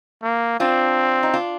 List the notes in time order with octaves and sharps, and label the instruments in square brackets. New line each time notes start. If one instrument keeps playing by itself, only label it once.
[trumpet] A#3
[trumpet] C4 [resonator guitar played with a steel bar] D4 F4
[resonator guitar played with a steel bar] D#4
D4 F4